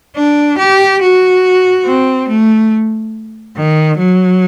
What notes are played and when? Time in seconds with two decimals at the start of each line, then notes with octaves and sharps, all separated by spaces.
0.16 D4
0.58 G4
1.02 F#4
1.85 C4
2.28 A3
3.56 D#3
3.98 F#3